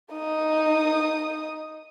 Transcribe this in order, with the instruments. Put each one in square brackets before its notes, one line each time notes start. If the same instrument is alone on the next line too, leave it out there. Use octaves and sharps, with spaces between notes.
[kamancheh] D#4 D#6